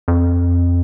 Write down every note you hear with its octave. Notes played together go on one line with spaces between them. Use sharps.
F2